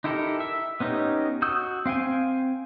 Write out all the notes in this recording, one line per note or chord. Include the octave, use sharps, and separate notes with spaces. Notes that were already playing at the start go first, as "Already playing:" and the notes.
D#4 E4 G4 A4 A#4
E5
B3 C#4 D#4 G4
F#4 D#6 E6 G6
C4 F5 G5 G#5